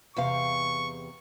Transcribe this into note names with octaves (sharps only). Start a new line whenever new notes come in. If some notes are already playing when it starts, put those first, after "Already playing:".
E2 C3 F5 C#6